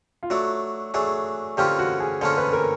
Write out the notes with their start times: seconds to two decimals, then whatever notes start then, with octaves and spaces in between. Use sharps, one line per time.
0.23 F4
0.30 F#3 A3 D4 F#4
0.94 F#3 A3 D4 G#4
1.57 D3 F3 A#3 C#4 F4 G4
1.79 F#4
2.00 G#4
2.21 D3 F3 A#3 C#4 F4 A4
2.38 B4
2.53 A#4